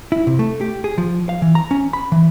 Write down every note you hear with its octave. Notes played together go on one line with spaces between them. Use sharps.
E4
C3
A3
G4
G#4
F3
F5
E3
A#5
C#4
B5
E3